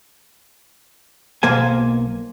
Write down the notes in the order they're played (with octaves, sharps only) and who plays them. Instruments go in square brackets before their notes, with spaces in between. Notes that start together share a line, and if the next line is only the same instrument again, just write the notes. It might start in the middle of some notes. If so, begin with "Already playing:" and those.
[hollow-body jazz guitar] B1 B2 A#3 C5 F5 G#5